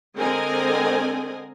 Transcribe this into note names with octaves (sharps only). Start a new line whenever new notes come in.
D3 G#3 C4 A#4 D#5 G#5